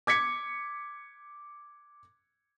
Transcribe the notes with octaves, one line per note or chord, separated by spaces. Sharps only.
D6 G#6 B6 C#7